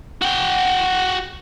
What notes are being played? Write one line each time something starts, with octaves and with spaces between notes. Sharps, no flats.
F#4 G5